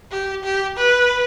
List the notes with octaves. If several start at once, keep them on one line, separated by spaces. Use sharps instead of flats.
G4
G4
B4